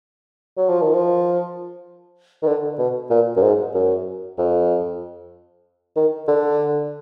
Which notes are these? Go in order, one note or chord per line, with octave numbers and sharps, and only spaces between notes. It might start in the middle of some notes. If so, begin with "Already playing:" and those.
F#3
F3
D#3
F3
D#3
D3
B2
A#2
F#2
G#2
F#2
F2
D#3
D3